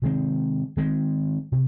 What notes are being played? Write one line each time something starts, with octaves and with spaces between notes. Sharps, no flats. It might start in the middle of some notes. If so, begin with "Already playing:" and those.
C3 D#3 G#3 C4
D#3 G#3 C4
C3